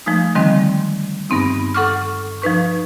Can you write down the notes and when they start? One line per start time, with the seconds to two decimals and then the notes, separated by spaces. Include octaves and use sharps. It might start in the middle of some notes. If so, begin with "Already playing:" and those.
0.06 F3 G#3 A3 D#4
0.35 D3 D#3 F3 G3 G#3 C4
1.30 G2 B3 C4 D#4
1.74 A4 F#5 C#6 D6 F6
2.42 F3 D#4 B4 C#6